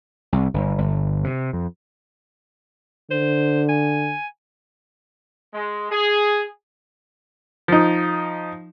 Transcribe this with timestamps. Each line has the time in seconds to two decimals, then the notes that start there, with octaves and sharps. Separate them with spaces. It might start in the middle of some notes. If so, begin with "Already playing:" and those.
0.32 C2
0.54 G1
0.78 G1
1.24 C3
1.53 F2
3.11 D3 C5
3.69 G#5
5.53 G#3
5.91 G#4
7.68 F3 D#4